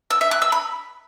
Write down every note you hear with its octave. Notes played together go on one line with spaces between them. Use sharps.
E6
E5
F#6
E6
B5